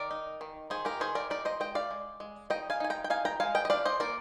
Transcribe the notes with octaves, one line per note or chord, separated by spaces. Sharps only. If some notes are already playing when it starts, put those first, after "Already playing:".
Already playing: D#3 A#4 D5
D#4
D#3
D#3 G#4 C5
G4 A#4
D#3 G#4 C5
A#4 D5
D#4 A#4 D5
C5 D#5
G#3 D#5 G5
D5 F5
G#3
G#3
D#4 D#5 G5
F5 G#5
D#4 G#5
G5 A#5
G5
D#4 F5 G#5
G5 A#5
G#3 F5 G#5
D#5 G5
D#5
D4 D5 F5
C5 D#5
A#3 A#4 D5